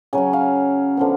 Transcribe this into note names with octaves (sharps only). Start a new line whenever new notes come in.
C#3 F#3 C#4 G#5
F5
D3 F3 B3